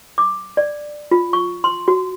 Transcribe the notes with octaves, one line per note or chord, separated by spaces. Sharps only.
D6
D5
F4
C#6
C6
F#4